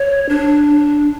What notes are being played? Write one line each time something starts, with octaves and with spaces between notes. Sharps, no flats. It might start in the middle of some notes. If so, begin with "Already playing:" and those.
Already playing: C#5
D4